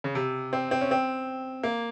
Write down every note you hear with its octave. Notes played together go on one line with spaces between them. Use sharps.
C#3
C3
C4
C4
C#4
C4
A#3